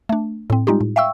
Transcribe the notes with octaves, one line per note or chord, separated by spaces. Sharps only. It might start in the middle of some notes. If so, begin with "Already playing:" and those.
A3 D4
A2 C4
G3 G#3 D#4 F4 G4
A2
E5 F5 G5 C#6 E6